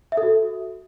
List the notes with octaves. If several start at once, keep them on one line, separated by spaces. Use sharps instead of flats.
E5
A4
F#4